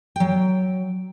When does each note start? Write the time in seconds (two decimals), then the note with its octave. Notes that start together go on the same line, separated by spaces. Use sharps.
0.16 F#3 G5